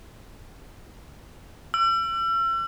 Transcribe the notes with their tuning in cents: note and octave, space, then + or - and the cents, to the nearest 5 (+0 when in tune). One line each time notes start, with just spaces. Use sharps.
E6 +40